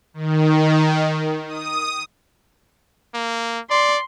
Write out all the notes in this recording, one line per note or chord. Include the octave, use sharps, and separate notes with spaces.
D#3
D#6
A#3
D5 C6